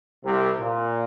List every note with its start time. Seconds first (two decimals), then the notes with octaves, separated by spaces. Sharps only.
0.24 C2 C3
0.60 A#2